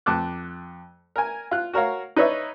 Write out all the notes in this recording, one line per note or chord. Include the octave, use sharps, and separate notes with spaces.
F2 A5 D6 F#6
A#4 G#5
F4 F#6
F#4 A#4 C#5 F5
D#4 B4 C#5 D5 E5